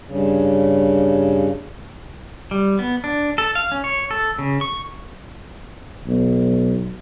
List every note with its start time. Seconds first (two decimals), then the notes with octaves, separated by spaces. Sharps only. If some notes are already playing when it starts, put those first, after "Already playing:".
0.08 G2 C#3
2.51 G3
2.79 B3
3.04 D4
3.38 A4
3.55 F5
3.72 C#4
3.84 C#5
4.11 A4
4.39 C#3
4.61 C#6
6.07 B1